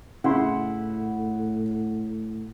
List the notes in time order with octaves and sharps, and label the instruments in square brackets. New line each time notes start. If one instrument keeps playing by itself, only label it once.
[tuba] A2 [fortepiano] C#3 E4 C6 [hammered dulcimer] F#5